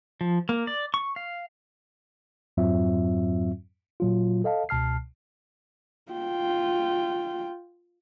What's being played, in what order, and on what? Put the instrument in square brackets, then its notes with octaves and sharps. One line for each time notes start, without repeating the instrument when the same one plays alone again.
[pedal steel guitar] F3
A#3
D5
C#6
F5
[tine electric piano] F2 G#2 F#3 C4 F4 E5
A#2 F#3 F4
A4 D#5 F5 A5
C#2 B2 A5 F6 C7
[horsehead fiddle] F4 G5